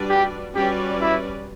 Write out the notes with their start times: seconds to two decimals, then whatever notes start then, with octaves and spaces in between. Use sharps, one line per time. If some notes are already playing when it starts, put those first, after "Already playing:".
Already playing: G3 D4 F#4 B4 D5
0.10 G4
0.55 G3 C#4 F#4 G4 B4 D5
1.01 E4